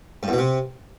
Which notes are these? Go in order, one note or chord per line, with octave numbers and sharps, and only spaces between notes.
G2
E2
B2
C3